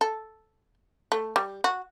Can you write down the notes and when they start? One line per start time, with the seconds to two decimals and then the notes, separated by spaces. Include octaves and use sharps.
0.01 A4
1.12 A3
1.36 G3
1.64 F#4